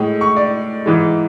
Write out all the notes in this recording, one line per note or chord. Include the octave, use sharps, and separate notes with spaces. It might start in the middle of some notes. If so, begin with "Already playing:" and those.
Already playing: A2 G#3
C#6
D5
G#2 E3 G#3